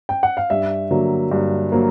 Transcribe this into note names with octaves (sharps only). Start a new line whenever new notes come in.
G5
F#5
F5
G2 E5
D3 F#3 A#3
G2
F#3 A#3